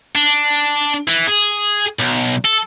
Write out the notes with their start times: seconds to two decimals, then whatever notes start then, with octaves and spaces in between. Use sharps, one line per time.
0.15 D4
1.07 E3
1.27 G#4
2.00 B1
2.45 A4